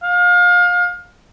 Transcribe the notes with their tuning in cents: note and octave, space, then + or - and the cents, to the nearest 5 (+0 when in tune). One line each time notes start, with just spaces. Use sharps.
F5 +30